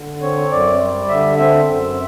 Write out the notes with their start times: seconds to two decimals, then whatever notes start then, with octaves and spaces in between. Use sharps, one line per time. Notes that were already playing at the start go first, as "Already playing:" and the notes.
Already playing: D3
0.21 C4 C#5
0.51 F#2 D5
0.80 G3
1.09 D3 E5
1.38 C4 E5
1.68 F#2